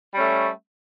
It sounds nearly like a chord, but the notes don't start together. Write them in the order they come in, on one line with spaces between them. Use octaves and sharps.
G3 C#4 A3